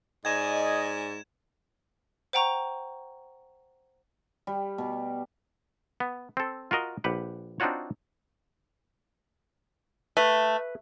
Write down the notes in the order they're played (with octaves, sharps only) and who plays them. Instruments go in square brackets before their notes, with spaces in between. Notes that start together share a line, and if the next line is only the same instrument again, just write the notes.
[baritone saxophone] G#2 [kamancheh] D5 G#5 [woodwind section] D#5 [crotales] G#6 E7
[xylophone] C5 F#5 G5 A#5 C#6 F7
[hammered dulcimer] G3
B2
[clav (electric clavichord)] B3
C4 A4
F4 F#4 A#4 D#5
A#1 G4 B4 F#5
C4 D4 D#4 F4 F#4 C#5
[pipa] A3 [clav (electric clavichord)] B4